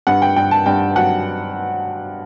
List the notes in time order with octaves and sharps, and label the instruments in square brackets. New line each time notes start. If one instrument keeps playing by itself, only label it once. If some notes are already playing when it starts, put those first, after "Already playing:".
[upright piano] G2 F#5
G5
G2 G5
A5
G2 G5
F#3 F#5